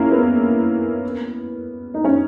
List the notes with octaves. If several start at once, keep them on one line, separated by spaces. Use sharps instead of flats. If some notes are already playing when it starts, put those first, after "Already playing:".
Already playing: A#3 C#4 E4
B3
D#4
C#4